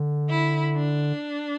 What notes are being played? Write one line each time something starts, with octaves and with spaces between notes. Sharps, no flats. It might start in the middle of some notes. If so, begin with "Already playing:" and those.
Already playing: D3
E4
D4